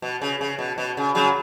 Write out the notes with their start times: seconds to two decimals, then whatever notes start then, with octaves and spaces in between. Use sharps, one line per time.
0.02 B2
0.22 C#3
0.41 C#3
0.59 B2
0.78 B2
0.97 C#3
1.15 C#3 F#3